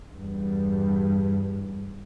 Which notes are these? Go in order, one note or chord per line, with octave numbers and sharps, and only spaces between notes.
E2 G2